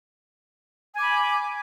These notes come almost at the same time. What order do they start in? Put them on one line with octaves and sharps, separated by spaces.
G#5 D6 B5